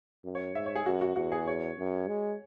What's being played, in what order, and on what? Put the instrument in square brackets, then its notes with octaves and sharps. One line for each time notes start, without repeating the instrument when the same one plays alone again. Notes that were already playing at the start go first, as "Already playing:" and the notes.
[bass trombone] F#2
[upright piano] C#5
[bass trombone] G#2 [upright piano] E5
[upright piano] C#5
G#4
[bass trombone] F#2 [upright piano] F#4
[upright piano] F#4
[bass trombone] E2 [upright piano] F#4
[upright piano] G#4
C#5
[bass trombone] F#2
G#3